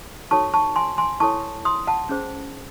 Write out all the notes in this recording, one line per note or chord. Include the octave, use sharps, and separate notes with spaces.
D#4 F#4 A4 C#5 A5 C#6
A5 C#6
G#5 C6
G#5 C6
E4 A4 C#5 A5 C#6
C6 D#6
F#5 A5
C#4 G#4 C5